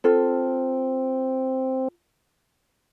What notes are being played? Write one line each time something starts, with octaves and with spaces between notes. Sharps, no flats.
C4 F4 A4